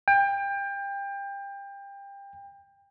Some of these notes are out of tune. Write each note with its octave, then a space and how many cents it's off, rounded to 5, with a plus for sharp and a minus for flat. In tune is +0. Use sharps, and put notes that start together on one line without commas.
G5 +25